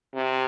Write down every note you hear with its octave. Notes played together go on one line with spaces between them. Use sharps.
C3